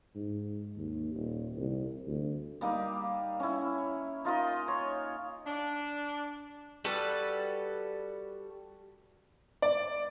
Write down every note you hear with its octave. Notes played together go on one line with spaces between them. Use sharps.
G#2
D#2
D#1
C2
D2
G3 A#3 D#4
C#4 E4
D#4 F4 A#4 D#5
C#5
D4
G3 F#4 A4 B4
D5